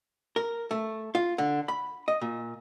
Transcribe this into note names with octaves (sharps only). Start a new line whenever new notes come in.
A#4
A3
F4
D3
B5
D#5
A#2